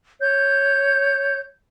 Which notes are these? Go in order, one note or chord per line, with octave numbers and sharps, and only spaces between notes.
C#5 G6